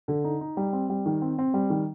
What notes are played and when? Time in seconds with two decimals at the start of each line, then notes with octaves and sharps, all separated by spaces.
0.08 D3
0.24 D#4
0.41 D#4
0.57 G3
0.73 C4
0.90 G3
1.06 D#3
1.22 C4
1.39 C4
1.54 G3
1.70 D#3